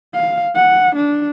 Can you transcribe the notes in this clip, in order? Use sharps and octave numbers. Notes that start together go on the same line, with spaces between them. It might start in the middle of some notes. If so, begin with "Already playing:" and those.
F5
F#5
D4